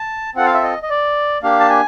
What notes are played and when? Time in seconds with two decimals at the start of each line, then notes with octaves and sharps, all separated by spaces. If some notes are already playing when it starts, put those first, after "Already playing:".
Already playing: A5
0.35 C4 F4 A4 F#5
0.45 F5
0.54 E5
0.63 D#5
0.83 D#5
0.90 D5
1.43 A#3 D4 G4 F5
1.60 A5
1.70 G#5